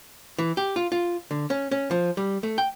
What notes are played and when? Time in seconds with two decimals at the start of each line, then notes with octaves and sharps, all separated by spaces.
0.38 E3
0.57 G4
0.76 F4
0.92 F4
1.31 D3
1.50 C#4
1.71 C#4
1.91 F3
2.17 G3
2.43 A3
2.58 G5